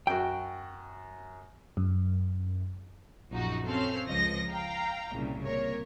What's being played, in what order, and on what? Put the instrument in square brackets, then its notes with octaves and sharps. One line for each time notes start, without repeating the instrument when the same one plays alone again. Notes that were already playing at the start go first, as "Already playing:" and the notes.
[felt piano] F#2 F#4 [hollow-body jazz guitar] G5
[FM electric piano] F#2
[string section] A#1 F#2 F3 D#4 F#4
C4 C#4 A4 C5 F5
C#2 F3 D#5 A#6
F5 G5 A#5
C2 A#2 C#3
A#2 A#4 C#5